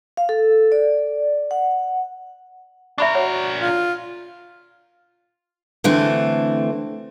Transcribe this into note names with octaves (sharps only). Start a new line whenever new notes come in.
F5
A4
D5
F#5
D4 A#4 E5 B5 C#6
F#4 C#5 F#5
F4
D3 E3 A3 C4